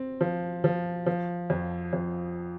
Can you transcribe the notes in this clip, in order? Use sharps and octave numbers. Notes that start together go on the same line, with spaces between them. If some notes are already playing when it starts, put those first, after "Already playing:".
Already playing: C4
F3
F3
F3
F2
F2